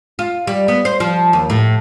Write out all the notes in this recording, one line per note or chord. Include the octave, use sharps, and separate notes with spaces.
F4
G3
B3
C5
F3
D#2
A2